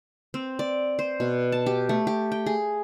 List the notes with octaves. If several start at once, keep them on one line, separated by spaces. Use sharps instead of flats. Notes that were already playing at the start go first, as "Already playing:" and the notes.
C4
D5
C5
B2
A5
G4
A3
G4
G5
G#4